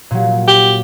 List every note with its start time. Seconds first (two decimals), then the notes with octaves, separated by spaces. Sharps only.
0.11 A#2 F#3
0.47 G4